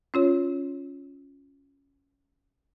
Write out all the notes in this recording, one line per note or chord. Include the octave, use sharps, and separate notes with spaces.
C#4 F4 C#5